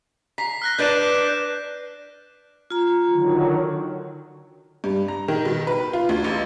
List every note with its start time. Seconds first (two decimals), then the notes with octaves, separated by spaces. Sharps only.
0.38 A#5 B6 C7
0.62 F6 F#6 A#6
0.78 D4 B4 D5 G6 D7 E7
2.70 F4 A#5
3.10 D3 D#3 F#3
4.84 G2
5.08 A#5
5.28 D#3
5.45 B2
5.67 B4
5.93 F4
6.09 D2
6.24 A1